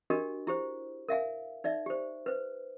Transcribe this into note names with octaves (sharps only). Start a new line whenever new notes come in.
D4 F#4 G4 A#4 D#5
E4 G4 C5
A#4 E5 F5 G#5
D#4 D5 E5
G4 C5
B4 C5